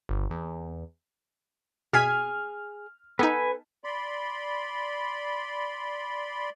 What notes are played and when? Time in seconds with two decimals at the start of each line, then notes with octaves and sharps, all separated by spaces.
0.09 G1
0.30 E2
1.93 B2 G#4 G#5 F6 G#6 B6
3.19 B3 D#4 A4 B4 G#5
3.84 D5 B5 C6